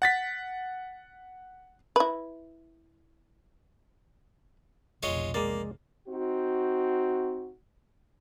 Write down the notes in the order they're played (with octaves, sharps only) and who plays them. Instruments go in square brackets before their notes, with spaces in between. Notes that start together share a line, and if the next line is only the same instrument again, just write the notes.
[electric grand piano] F#5 A6 B6
[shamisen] E4 B4
[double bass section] F1 B1 C#3 [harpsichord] G#3 F4 C#5
[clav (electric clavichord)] G#3 D5 [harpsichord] A#3
[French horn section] C4 D#4 F#4